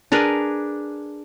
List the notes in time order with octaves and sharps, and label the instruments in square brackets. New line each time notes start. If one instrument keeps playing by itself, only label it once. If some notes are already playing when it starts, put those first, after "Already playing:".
[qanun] D4 G#4 A#4 B4